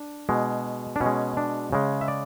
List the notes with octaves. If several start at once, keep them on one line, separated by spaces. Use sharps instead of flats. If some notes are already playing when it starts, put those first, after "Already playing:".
Already playing: D4
B2 G#3
D4
B2 C#4
G#3
D4
C#3 G#3
E5
D5